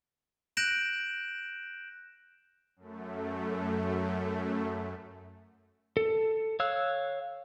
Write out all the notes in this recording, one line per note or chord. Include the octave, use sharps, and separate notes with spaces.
F#6 G6 A#6 D7 E7 F#7
F#2 A3
A4
C#5 F5 E6 F#6